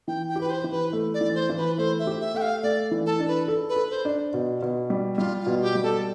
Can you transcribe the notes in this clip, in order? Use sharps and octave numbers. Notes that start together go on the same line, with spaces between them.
E3 G5
G5
G4
B4
C5
E3
B4
A3
D5
E3
C5
E3
B4
A3 C5
E5
G4
E5
A3 G5
F5
A3 D5
E3
A4
D4
B4
A4
B4
A4
C5
D4
B2
B2
G3
G3 F4
F4
B2
G4
G3
A4